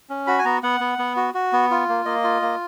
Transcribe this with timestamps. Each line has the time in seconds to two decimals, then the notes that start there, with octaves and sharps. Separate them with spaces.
0.10 C#4
0.27 F#4 B5
0.39 G#5
0.45 B3 A#5
0.63 B3 F#5
0.80 B3
0.98 B3
1.16 F#4
1.34 F#4
1.53 B3
1.71 F4
1.89 A#3
2.05 A#3 D#5
2.24 F4
2.42 A#3